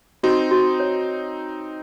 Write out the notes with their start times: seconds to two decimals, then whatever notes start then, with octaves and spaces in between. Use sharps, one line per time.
0.23 C4 D#4 F#4
0.51 F#4
0.80 C#5